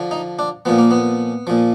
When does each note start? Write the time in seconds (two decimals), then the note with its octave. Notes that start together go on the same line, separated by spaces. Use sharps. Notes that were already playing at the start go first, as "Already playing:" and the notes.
Already playing: D3 F3
0.11 D#4
0.39 D4
0.65 A#2 F3 B3
0.78 A#3
0.91 B3
1.47 A#2 F3